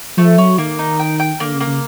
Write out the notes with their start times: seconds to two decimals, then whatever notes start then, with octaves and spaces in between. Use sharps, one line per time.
0.17 F3 A3
0.38 F#3 C#4
0.58 D#3 A#3
0.79 D#4
0.99 G5
1.19 G5
1.40 D3 A#3
1.54 C#3
1.60 A#3
1.67 C#3